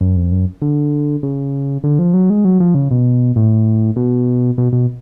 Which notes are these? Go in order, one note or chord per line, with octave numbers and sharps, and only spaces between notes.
F#2
F2
F#2
D3
C#3
D3
F3
F#3
G#3
F#3
F3
C#3
B2
A2
B2
B2
B2